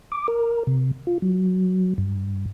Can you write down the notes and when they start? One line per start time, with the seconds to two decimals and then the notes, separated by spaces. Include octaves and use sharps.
0.12 D6
0.28 A#4
0.67 C3
1.07 F4
1.22 F#3
1.98 G2